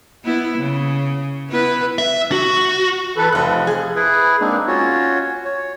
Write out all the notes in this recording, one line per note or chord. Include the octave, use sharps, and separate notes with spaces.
B3 E4
C#3
B3 E4 B4
E5
F#4
E3 A4 B4
F1 F3 F#6
G#4
E4 G#4 B4
G#3 A#3 C4 D4 D#4
C#4 F4 F#4 C#5
C#5